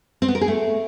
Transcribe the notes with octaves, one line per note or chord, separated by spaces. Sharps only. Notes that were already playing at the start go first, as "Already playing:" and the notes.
C4
B3
A#4
G#4
A3